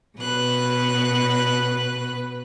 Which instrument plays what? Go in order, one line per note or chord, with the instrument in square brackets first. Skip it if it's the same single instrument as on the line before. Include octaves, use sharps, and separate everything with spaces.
[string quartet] B2 B4 F#6